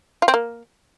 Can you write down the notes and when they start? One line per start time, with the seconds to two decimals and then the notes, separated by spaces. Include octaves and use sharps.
0.22 F4
0.28 C4
0.34 A#3